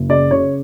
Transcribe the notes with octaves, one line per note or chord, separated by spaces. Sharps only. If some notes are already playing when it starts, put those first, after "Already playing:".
Already playing: F#1
C#3 D5
C#3 C#5